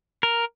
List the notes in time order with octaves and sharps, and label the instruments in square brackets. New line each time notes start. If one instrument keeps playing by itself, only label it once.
[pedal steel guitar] A#4